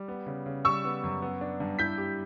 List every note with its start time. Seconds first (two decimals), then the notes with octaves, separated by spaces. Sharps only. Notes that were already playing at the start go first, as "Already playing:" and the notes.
Already playing: G3
0.08 B3
0.26 C#3
0.46 C#3
0.65 G3 C#6 E6
0.84 B3
1.04 F#2
1.22 B3
1.41 D4
1.60 G2
1.79 E4 G6 B6
1.98 G4